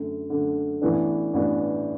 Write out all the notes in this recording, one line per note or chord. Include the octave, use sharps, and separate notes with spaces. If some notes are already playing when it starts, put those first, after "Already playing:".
Already playing: F#2 D3 A3
F#2 D3 A3
A1 A2 E3 B3 D4
A1 A2 E3 B3 D4